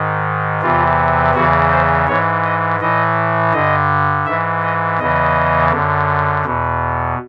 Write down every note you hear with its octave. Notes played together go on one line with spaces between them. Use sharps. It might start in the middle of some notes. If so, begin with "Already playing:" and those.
Already playing: G#2 D#3
E2 C3 E3 F4
E2 C#3 E3 F#4
C5
G#2 E3 C#5
D#5
A2 E3 D#5
G2 D3 D#5
G#2 E3 E5
D#5
E2 C#3 E3 D#5
F#2 D3
E2 B2